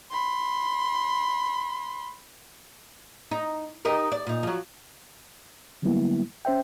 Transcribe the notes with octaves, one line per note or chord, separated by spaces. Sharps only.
B5 C6
D#4
D#4 G4 A#4
D5
A#2 D#4
F3 F#3
D3 F#3 G3 A#3 B3 E4
C#4 C5 E5 G5